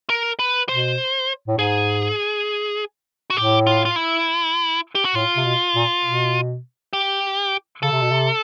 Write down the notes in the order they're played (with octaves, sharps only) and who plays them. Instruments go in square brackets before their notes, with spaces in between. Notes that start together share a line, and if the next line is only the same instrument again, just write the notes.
[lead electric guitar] A#4
B4
[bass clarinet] B2 [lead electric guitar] C5
[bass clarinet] A2
[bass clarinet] G#2 [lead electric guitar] G#4
[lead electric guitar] F#4
[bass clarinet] A2 [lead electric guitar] G4
[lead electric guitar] F4
F4
E4
G4
F#4
[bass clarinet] A2 [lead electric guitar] F4
[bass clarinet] C3
B2
A#2
B2
[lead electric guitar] G4
[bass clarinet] C#3 [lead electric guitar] A4
[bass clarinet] C3
B2
C3